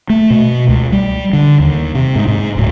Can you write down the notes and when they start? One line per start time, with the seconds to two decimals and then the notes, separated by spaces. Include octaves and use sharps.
0.10 A3
0.30 B2
0.69 C#2
0.92 G3
1.33 D3
1.60 D#2
1.95 C3
2.16 G#2
2.28 G#2
2.57 D1